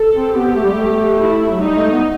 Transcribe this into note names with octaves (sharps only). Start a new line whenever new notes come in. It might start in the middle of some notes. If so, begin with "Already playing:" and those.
Already playing: A4
C4
B3 G4
A3
G3
A3
E4
F#3
G3 D#4
A3
B3